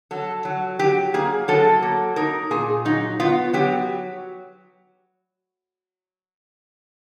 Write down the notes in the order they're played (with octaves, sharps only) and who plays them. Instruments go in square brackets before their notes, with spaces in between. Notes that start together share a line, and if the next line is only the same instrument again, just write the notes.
[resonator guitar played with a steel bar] F#3 A4
F#3
F#3 G4
A#3 G#4
F#3 A4
A#3
D#4 A#4
A#2 G#4
F#3 D#4
B3 F4
F#3 G4